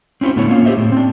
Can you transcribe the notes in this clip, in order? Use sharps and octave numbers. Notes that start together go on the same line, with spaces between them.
C4 C#4 E4 F#4 C5
A2 D3 B3 E4 C#5
A#3 C#4 F4 E5 F5
F4 G4 G#4 C5 D#5 E5
A2
C4 D4